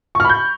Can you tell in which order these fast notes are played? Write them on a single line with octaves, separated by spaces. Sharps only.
C#6 F6 B5 G6